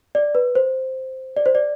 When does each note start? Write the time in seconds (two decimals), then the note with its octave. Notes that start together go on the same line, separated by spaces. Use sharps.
0.15 D5
0.35 B4
0.55 C5
1.37 D5
1.46 C5
1.55 D5